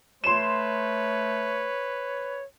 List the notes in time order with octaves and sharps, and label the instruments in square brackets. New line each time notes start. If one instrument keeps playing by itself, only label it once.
[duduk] A3 [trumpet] B4 [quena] C#5 [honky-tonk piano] C6 E7